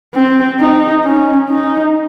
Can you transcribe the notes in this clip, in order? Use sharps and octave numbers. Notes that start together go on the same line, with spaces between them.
C4
D#4
C#4
D#4